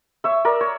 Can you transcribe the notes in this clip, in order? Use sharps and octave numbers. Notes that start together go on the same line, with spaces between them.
C#5 E5
A#4 D5
C#5